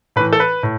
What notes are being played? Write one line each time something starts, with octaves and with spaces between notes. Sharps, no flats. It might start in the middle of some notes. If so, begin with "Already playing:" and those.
A2 E3 B4
A4
B4
A2